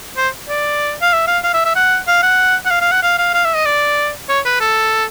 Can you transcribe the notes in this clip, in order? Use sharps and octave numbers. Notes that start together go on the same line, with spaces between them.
C5
D5
F5
E5
F5
F5
E5
E5
F#5
F5
F#5
F#5
F5
F5
F#5
F5
F5
F5
E5
D#5
D5
C#5
B4
A4